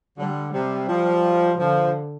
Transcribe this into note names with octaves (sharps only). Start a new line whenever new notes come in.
D3 G3
C3 G3
F3
D3 F3